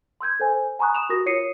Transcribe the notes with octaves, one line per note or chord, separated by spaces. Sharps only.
C6 E6 G6 G#6
A4 C5 G#5
G#5 A#5 B5 C#6 D#6 F#6
D#6 E7 F7
F#4 G4 A#4 D#6 A#6
F4 C#5 D#6 C7 C#7 D#7